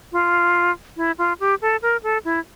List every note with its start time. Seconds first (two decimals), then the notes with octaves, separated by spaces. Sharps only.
0.12 F4
0.97 E4
1.18 F4
1.40 G4
1.62 A4
1.82 A#4
2.03 A4
2.25 E4